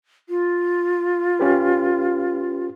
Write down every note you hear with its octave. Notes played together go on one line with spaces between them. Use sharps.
F4
C#4 G4 B4